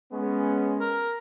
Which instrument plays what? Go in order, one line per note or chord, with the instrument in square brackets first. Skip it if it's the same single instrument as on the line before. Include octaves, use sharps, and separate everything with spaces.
[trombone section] G#3 B3 C#4
[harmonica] A#4